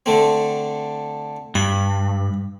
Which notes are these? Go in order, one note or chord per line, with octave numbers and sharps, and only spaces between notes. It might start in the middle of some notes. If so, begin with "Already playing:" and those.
D3 A3 C4
G2 B5